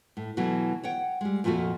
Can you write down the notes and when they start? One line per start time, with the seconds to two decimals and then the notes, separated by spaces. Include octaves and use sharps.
0.17 A2
0.37 B2 E3 F#3 A3
0.83 C#5 F#5 G5
1.21 G3 G#3
1.44 F2 A#2 F3 A3 F#4